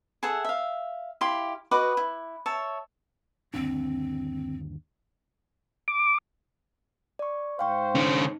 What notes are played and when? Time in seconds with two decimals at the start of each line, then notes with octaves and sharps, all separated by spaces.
0.23 G#4 A4 E5 F#5
0.45 E5 F5
1.21 E4 G4 F5 C6
1.71 F#4 B4 D#5 D6
1.97 E4
2.46 C#5 E5 A5
3.54 G1 D#2 C4 D4
5.88 D6
7.19 D5 C#6
7.59 G#2 C5 F5 G5 C#6
7.95 D3 C#4 D#4